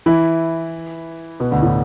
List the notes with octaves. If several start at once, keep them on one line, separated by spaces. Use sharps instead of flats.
E3 E4
B2 B3
D2 D3
A2